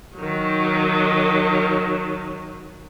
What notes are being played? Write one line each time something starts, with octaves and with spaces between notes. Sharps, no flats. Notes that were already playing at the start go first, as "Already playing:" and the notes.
D#3 F#3